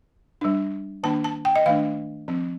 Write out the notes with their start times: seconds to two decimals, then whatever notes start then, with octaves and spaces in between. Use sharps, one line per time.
0.41 G3 D4
1.03 D#3 A#3 D4 A5
1.24 A5
1.45 G5
1.55 D#5
1.66 D#3 A3 D4 F5
2.28 F3 C4